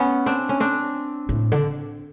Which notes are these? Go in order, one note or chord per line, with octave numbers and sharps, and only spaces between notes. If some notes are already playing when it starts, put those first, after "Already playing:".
Already playing: B3 C#4
C4 D4
C#4
C4 D4
A2
D3